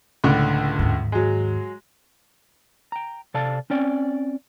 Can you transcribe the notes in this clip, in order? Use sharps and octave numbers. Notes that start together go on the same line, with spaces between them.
C#2 A2 D3
D#2 G#2
F#3 G#3
G5 A#5
C3 A4 D5 F5 A5
C4 C#4 D5 G5